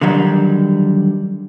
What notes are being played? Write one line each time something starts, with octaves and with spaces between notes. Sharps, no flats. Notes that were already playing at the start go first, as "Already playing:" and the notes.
D3 D#3 F#3 G3